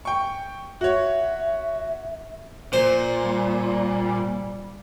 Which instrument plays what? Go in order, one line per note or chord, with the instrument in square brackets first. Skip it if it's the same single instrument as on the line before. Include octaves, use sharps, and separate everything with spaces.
[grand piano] G5 C#6
[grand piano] F#4 C#5 [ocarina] E5
[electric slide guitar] A#2 [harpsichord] C5
[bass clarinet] G3